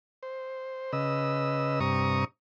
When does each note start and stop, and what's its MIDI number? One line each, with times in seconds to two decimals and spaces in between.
0.23 0.92 72
0.93 1.80 49
0.93 1.80 71
0.93 1.80 75
0.93 1.80 88
1.80 2.25 43
1.80 2.25 48
1.80 2.25 82
1.80 2.25 85
1.80 2.25 87